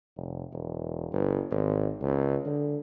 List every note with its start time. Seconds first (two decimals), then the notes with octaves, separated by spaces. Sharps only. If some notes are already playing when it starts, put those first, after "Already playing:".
0.16 F1
0.52 E1
1.12 G1
1.51 G#1
2.01 C#2
2.45 D3